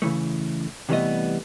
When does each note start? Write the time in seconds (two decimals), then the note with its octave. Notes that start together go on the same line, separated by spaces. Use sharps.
0.02 C#3 E3 A3
0.89 C3 E3 G3 A3 B3 D#5